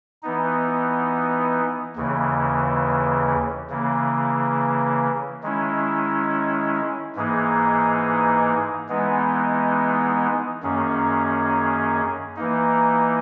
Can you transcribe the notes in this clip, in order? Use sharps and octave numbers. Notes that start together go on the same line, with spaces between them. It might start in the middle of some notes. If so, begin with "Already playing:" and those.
E3 B3 D#4
D#2 C#3 E3
C#3 E3 A#3
D#3 G#3 C#4 E4
G#2 E3 A#3 D#4 G#4
E3 G#3 B3 D#4
F#2 D#3 A#3 C#4 G#4
E3 A#3 D#4